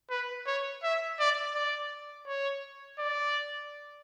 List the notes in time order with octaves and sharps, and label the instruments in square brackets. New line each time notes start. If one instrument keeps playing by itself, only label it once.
[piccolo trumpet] B4
C#5
E5
D5
D5
C#5
D5